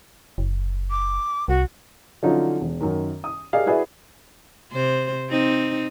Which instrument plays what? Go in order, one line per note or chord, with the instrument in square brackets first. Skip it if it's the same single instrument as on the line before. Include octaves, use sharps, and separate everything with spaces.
[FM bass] F#1
[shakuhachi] D6
[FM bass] C2 [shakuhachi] F#4
[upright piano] D3 F3 F#3 C#4 D#4 F4
E1
F#2 D#3
D#6
G4 G#4 A#4 D5 D#5 F5
E4 F#4 G#4 B4 D5 E5
[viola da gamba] C3 C5
C4 D#4